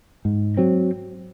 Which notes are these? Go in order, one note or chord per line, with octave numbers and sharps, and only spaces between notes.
G#2
F#3 C4